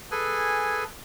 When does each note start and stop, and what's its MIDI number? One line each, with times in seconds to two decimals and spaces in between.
0.11 0.84 68
0.11 0.84 69
0.11 0.84 71
0.11 0.84 80